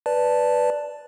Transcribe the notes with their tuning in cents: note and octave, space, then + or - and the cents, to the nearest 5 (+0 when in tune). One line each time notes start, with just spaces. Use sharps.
B4 +0 D5 +0 A5 +0